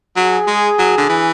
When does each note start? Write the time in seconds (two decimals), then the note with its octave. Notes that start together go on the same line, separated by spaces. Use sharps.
0.16 F#3 G#4
0.47 G#3
0.79 F#3
0.98 D3
1.09 E3